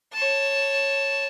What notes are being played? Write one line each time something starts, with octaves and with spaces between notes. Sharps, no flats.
C#5 A5